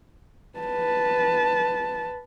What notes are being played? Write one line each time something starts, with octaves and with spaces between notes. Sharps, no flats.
B4 A5